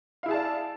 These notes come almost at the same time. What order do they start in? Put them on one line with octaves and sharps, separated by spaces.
F5 E4 G#4 A5 D5